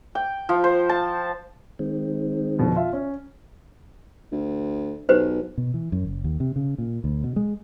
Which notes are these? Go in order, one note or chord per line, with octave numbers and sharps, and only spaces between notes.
G5
F3
C5
A5
D#3 G#3 C4
F2 B2 D3
F4 E5
C#4
D2
B1 G4 B4 C5
B2
E3
F#2
F#1
D#2
C3
C#3
A#2
D2
B2
G#3